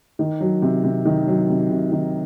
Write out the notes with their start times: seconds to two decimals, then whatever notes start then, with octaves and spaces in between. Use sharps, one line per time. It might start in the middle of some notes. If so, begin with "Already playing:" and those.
0.19 D#3
0.41 F#3
0.62 C3
0.84 C3
1.05 D#3
1.27 F#3
1.49 C3
1.71 C3
1.92 D#3